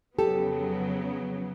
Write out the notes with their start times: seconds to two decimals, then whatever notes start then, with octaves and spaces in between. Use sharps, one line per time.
0.18 F2 C#3 F#3 B3 G4 A4